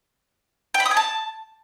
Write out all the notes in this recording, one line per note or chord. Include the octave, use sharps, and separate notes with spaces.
G5
B5
D#6
G#5
A5